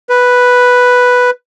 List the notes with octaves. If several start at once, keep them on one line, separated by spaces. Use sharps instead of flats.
B4